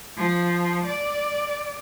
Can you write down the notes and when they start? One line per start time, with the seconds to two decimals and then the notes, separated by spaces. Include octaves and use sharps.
0.17 F3
0.86 D5